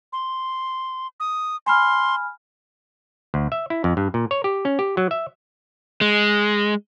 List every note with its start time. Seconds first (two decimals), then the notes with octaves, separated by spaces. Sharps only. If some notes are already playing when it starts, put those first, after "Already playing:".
0.13 C6
1.20 D#6
1.66 G#5 B5 C6 F6
3.34 D2
3.52 E5
3.70 E4
3.84 F2
3.97 G2
4.14 A#2
4.31 C#5
4.44 G4
4.65 C#4
4.79 G4
4.97 F#3
5.11 E5
6.01 G#3